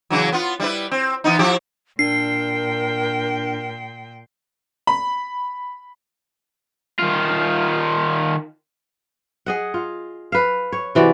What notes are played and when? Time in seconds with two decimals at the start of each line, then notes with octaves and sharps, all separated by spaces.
0.10 C#3 E3 F#3
0.32 B3 F4
0.60 G3 E4 B4
0.91 C4
1.24 E3 B3 D#4
1.39 F3 E4 G4
1.99 A#2 D4 A#4 G5 C7
4.87 B5
6.99 D#3 F4
9.46 G#4 D#5 F#5
9.74 F4
10.32 B4 F5
10.72 C#5
10.95 C3 E3 F#4 D5